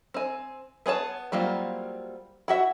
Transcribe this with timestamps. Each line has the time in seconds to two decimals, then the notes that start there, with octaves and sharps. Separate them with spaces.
0.14 C4 G#5
0.86 B3 G#4 C#5 A5
1.32 F#3 G3 A#3 C4 F4
2.48 E4 F#4 E5